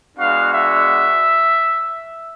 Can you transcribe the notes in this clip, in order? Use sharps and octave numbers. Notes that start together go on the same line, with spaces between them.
G#3 B3 D4 F#4 F5
E5